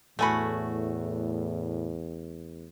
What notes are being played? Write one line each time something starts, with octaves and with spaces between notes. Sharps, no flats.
E2 A2 F#3 A3 F#4 G#5 B5